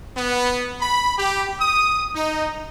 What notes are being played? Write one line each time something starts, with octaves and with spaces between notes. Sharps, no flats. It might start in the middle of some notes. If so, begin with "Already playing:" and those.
B3
B5
G4
D#6
D#4